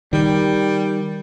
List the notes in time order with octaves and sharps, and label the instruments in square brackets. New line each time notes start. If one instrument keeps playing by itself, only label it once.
[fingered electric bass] D#3 [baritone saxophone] G3